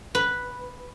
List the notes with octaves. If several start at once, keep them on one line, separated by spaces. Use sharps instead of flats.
B4